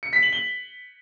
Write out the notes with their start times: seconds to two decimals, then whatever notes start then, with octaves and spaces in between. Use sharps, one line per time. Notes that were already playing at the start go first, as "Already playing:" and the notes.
0.03 C#7
0.13 B6
0.23 F#7
0.33 G7